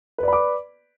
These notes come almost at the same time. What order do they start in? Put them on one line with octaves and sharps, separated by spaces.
B4 D5 B5 D6